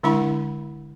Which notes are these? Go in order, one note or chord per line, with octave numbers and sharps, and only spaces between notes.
D3 G#3 D4 E4 F#5 B5